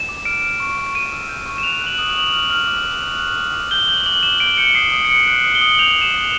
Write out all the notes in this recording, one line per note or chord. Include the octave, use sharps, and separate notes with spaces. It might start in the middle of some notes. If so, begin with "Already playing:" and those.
Already playing: E7
D6
F6 D7
F6
C#6
C#6
C#6 D#7
E6
G6
C#6
E7
F#6 F7
F#6 F#7
D#6
F#7
D#6
F6
F6
D6
D6
F#6
F#6
D6
D6
G6 G7
G6 F#7
D6 F#7
D6 E7
G6 D7
G6 C#7
D#6 C7
D#6 D7
C#7
F#6 D7
F#6
D#6
G7
D#6
F#7
G6 F7
G6 E7
D#6